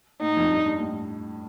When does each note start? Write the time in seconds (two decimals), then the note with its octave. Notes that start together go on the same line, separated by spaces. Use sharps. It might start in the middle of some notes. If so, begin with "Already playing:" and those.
0.21 A2 D#4
0.37 F2
0.51 G2
0.66 G2
0.80 A2